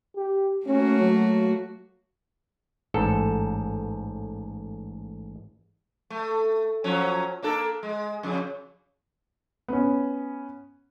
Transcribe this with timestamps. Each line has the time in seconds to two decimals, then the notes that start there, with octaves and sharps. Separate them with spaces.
0.16 G4
0.66 A3 A#3 C#4 F#4
0.99 F#3
2.94 A1 G#2 A4
6.10 A3
6.84 F3 F#3 C#4
7.42 A#3 D4 A4
7.83 G#3
8.23 F2 C#3
9.68 B3 C#4